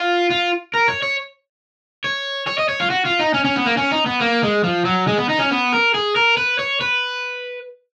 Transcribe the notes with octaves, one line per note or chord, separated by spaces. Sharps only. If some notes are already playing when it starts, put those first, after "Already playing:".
Already playing: F4
F4
A#4
C#5
C#5
C#5
C#5
D#5
C#5
F4
F#4
F4
D#4
C#4
C#4
B3
A#3
C#4
D#4
B3
A#3
G#3
F3
F#3
G#3
B3
D#4
C#4
B3
A#4
G#4
A#4
B4
C#5
B4